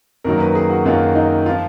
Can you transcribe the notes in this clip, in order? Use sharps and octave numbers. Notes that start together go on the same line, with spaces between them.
F#2 D#3 F#3 A#3 A#4
B4
G#4
F#4
F#2 D#3 F#3 A#3 F4
D#4
F3 F4